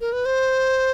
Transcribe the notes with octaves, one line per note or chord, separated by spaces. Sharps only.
A#4
B4
C5